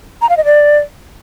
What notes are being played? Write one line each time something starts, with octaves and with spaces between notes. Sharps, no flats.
A#5
F5
D#5
D5